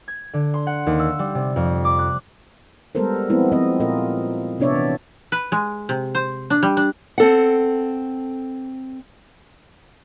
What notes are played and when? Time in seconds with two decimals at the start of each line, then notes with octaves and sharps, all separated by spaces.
0.08 G#6
0.33 D3
0.54 C6
0.67 F#5
0.87 D#2
0.99 E6
1.19 G3
1.35 C3
1.56 F2
1.85 D6
1.99 F#6
2.95 G3 G#3 B3 A4 A#4 C5
3.29 F3 G#3 B3 C4 E4
3.52 F3 B3 C4 D#5
3.80 A#2 G#3 F4 A#4 D#5
4.60 C3 B3 D4 C#5 D5 E5
4.74 E3 D4
5.32 B4
5.52 G#3
5.89 C3
6.15 C5
6.50 D4
6.63 G3
6.77 D4
7.18 C4 A4 F#5